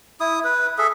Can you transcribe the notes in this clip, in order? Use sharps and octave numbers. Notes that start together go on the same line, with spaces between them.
E4 D#6
B4
G#4 A4 E5